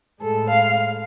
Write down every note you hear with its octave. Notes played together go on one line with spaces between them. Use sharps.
A2 G#3 A4
F5